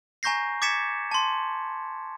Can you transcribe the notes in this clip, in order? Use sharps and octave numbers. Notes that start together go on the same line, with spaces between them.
G#5 A#5 C#6 G6 A#6 C7
D6 G#6 A6 B6 C#7 E7
A5 C6